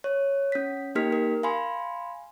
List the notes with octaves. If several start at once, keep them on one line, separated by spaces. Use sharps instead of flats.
C#5
C#4 B6
A#3 D#4 G4 A#4 F6 B6
A#4
F5 G#5 B5 C6